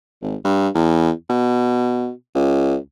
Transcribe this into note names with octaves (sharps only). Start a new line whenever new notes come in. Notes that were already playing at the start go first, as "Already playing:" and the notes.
G#1
G2
E2
B2
C#2